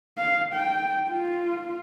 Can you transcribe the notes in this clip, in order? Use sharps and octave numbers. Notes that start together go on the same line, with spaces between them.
F5
G5
F4